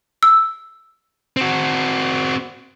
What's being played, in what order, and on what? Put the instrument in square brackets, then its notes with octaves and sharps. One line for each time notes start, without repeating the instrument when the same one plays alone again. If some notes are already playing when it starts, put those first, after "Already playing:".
[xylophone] E6
[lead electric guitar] C4 F#4